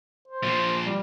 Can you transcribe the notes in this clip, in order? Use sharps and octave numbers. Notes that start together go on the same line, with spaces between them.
C5
A#2 F3
G3